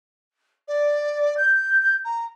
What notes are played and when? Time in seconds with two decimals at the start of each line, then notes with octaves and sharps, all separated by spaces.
0.68 D5
1.37 G6
2.04 A#5